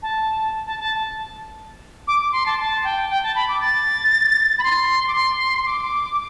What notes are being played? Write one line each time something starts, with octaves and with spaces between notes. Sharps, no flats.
A5
A5
A5
D6
D6
C6
A5
A5
G5
G5
A5
B5
D6
A6
B5
C6
D6
C6
D6